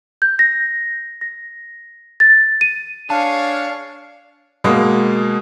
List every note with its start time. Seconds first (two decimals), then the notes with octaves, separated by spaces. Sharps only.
0.22 G6
0.39 A#6
1.21 A#6
2.20 A6
2.61 D#7
3.10 D4 G#4 C#5 F5 A5
4.64 B2 G#3 A#3